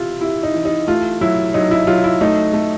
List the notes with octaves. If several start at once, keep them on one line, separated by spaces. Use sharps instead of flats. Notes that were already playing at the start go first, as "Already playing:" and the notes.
Already playing: C3 E3 E4 F4
C3 E4
D#4
E3
D#4
A3 F4
F#3 E4
F#3 D#4
E4
F#3 F4
E4
A3 D#4
A3